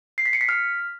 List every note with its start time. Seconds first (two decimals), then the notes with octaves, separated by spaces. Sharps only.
0.18 C7
0.26 B6
0.33 C#7
0.41 B6
0.49 F6